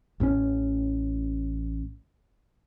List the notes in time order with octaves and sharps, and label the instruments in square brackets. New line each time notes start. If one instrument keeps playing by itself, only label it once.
[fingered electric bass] A1 A2 C3 C#4